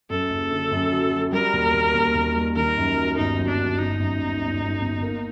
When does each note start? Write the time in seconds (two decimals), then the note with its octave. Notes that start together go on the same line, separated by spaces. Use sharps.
0.10 F#2 A4
0.30 F#1
0.51 D3
0.71 F#2
0.92 F#3
1.13 F#3
1.32 G3 A#4
1.53 D#2
1.74 D#2
1.94 D#2
2.15 D#2
2.35 G3
2.55 D#3 A#4
2.77 F#2
2.97 F#3
3.17 G1 D#4
3.38 F#3
3.48 D4
3.58 F#3
3.79 G1 D#4
3.99 F#2
4.20 G1
4.41 G1
4.61 G1
4.81 G1
5.02 A#3